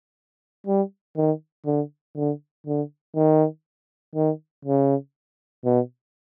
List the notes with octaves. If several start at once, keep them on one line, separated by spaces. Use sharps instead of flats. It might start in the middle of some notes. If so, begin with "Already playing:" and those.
G3
D#3
D3
D3
D3
D#3
D#3
C#3
B2